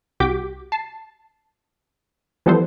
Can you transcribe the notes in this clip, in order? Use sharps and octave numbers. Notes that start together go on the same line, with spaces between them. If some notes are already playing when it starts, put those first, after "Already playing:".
C2 F#4 G4 D6 G6 B6
A5 C7
E3 F3 G3 B3 A4 C5